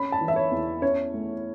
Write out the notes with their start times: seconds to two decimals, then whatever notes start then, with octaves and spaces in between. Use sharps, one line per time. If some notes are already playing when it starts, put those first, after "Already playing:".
Already playing: C#4 B5
0.12 A5
0.21 E3
0.28 E5
0.36 C#5
0.51 E2
0.82 C#4 C#5
1.14 A3